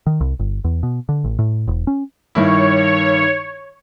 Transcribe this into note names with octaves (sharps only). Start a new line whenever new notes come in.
D#3
C2
G1
E2
B2
D3
A1
A2
E1
C#4
G2 D#3 E4 C#5